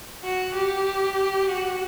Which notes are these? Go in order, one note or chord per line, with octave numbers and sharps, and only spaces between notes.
F#4
G4
F#4